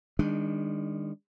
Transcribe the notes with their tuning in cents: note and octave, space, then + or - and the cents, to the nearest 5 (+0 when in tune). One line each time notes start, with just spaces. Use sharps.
D#3 +0 G#3 -35 D4 +0